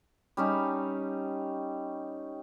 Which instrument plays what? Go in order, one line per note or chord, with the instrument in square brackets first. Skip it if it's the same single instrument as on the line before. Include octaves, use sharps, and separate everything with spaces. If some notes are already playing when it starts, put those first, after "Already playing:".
[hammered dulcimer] G3 C#4 D#4